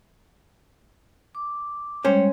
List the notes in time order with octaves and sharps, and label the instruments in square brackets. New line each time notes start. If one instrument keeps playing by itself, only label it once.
[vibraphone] D6
[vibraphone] G3 G#3 C#5 [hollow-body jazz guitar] C#4 C5